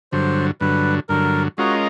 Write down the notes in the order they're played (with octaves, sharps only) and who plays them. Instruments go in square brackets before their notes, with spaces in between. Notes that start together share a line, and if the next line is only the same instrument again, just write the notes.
[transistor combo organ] G2 D3 F#3 [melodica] C5
[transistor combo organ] G2 D3 F#3 [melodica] B4
[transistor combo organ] G2 D3 F#3 [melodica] A#4
[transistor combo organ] G#3 C#4 F4 A#4 D#5 [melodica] F#4